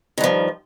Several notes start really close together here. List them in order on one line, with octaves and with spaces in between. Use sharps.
D#3 G2 F3